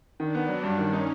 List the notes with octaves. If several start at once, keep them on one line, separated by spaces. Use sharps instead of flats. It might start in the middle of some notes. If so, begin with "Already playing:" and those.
D#3 D4
B3
F#3 D4
G2
D#3 C#4
D#4